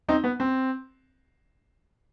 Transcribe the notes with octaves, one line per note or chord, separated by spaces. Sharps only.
C4 D#4
B3
C4